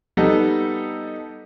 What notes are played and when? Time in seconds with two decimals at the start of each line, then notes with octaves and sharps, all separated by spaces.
0.17 G3 B3 D#4 A4